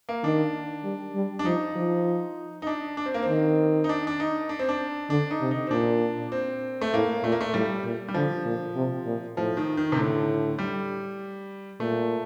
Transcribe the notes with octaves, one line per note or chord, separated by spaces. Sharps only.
A#3
D#3 D4
G3
G3
D4
F3 D#4
F3
D#4
D4
D4
C4
A#3
C4
D#3
D#4
D4
D4
D#4
D4
C4
D4
D3 D4
D#4
C3
D#4
C4
A#2 D4
C4
A3
A2 A#3
A#2 A3
A#3
A3
A2 G3
A#2
G3
D3 F3
A#2
C3
A#2
A2 F3
D#3
D#3
C3
A2 D3
G3
A#2 A3